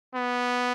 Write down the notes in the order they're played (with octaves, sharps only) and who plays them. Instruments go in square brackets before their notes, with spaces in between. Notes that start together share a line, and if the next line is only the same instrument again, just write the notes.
[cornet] B3